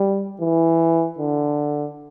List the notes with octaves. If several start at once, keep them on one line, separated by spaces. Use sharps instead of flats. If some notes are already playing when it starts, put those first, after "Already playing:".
Already playing: G3
E3
D3